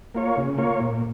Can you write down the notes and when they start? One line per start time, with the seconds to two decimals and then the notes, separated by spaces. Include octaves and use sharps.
0.15 A#3 F4 C#5
0.37 C#3
0.58 A#3 F4 C#5
0.80 A#2